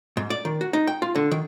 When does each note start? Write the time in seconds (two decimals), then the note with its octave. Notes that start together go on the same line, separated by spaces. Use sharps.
0.17 G#2
0.30 D5
0.45 D#3
0.61 F#4
0.73 D#4
0.87 G5
1.02 F4
1.16 D3
1.31 D#3